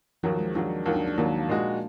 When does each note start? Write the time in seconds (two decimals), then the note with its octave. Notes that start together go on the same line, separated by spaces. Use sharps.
0.23 D#2 D#3 F3 F#3
0.39 G#3
0.55 D#2 D#3 F#3 D4
0.86 D#2 D#3 F#3
0.96 D4
1.08 D4
1.18 D#2 D#3 F#3 A#3
1.49 A#2 G#3 D#4 F#4